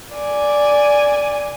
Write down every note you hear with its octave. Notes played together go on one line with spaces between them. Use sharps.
D5 G#5